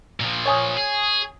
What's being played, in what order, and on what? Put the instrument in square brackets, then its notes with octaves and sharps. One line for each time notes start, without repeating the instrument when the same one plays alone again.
[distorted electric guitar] A#2 F3
[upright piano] C#5 G#5 D#6
[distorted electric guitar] G#4